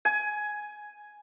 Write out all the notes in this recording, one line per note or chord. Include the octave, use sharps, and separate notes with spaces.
G#5